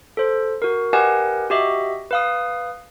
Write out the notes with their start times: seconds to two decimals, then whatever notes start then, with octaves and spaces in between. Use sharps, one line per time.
0.17 A4 C5
0.62 F#4 A#4
0.93 G4 A#4 B4 D#5 F#5 G#5
1.50 F#4 G4 D#5 E5
2.11 B4 F5 D#6